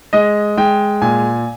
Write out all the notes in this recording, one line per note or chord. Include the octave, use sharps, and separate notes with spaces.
G#3 D#5
G#3 G5
A#2 G#5